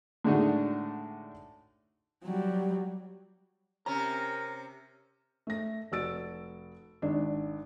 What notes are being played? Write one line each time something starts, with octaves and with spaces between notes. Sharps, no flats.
A2 D3 G#3 D4 D#4 F#4
F#3 G3
C3 C#4 A#4 A#5
A3 A#6
F1 F#4 E6 A6 D7
G#1 D4